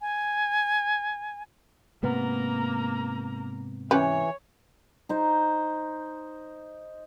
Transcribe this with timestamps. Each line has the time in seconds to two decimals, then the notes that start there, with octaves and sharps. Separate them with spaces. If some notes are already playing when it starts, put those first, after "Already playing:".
0.01 G#5
2.03 G#2 C3 A#3 B3 A#5
3.91 E3 C#4 G4 B4 C#5
5.09 D#4 C5